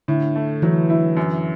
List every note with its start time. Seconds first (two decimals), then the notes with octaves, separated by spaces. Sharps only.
0.08 A2 D3
0.35 A3
0.62 E3 F#3
0.90 E4
1.17 F#2